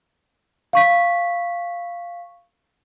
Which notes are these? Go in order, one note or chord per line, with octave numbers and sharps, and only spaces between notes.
F5 C#6 B6